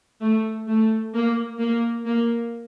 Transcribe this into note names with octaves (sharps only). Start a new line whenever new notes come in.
A3
A3
A#3
A#3
A#3